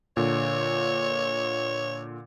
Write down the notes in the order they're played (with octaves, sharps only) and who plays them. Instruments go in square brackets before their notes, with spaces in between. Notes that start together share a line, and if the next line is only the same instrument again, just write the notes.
[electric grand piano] A#2 D3 [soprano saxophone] C#5